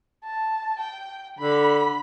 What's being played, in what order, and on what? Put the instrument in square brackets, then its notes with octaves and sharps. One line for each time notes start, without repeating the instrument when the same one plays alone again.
[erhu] A5
G5
[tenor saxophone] D3 [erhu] B5